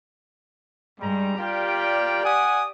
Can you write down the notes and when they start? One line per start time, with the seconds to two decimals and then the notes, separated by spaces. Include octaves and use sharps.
1.01 G2 G3 G#3 A#5
1.39 F4 G4 A#4 D5 G5
2.24 F#5 G#5 D#6